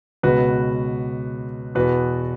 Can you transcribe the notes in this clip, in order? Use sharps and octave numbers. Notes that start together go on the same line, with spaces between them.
C#2 B2 F#4 B4
E2 B2 F#4 B4